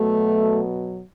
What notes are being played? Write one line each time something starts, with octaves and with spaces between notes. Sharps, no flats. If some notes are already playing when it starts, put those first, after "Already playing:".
Already playing: B2 F#3 A3